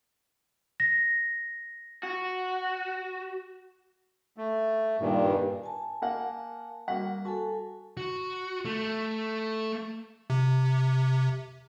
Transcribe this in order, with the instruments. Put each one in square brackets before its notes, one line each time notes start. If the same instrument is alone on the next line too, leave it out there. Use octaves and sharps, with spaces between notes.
[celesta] A#6
[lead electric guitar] F#4
[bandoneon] A3
[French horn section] G2 [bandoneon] A#2 D#3
[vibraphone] G#5 A5
[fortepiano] A#3 F5 F#5
[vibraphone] G3 [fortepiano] A#3 F#4 F#5
[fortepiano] F#4 [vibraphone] A4 G#5 A5
[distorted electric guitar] F#4
A3
[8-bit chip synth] C3